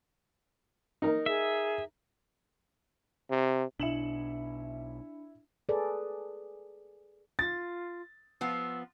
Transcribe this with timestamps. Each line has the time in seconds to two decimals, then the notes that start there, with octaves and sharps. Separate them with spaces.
1.02 D#4 A#4
1.26 G#4 E5
3.30 C3
3.80 B1 B2 D4 E4 C#7 E7 F#7
5.69 G#4 A4 B4 D5
7.39 F4 A6
8.41 F3 B3 F4 E6